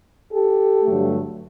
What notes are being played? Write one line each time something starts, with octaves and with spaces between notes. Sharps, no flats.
G4 A4
G2 D3 F#3 A3